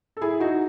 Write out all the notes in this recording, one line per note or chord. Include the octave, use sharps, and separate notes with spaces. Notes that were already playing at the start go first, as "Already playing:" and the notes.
A4
E4 G#4
D#4 F#4